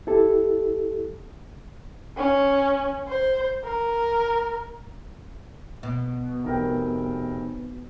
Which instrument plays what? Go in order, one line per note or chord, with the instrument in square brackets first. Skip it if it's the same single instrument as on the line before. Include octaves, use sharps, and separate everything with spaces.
[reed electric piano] E4 G4 A4
[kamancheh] C#4
C5
A#4
[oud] B2
[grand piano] F1 A#4 G5